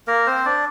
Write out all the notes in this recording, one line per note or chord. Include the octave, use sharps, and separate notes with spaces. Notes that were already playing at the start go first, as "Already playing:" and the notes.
A#3 A#4
C4 C5
D4 D5